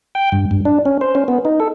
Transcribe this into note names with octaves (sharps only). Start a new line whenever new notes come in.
G5
G2
G2
D4
C#4
C5
C#4
B3
D#4
A4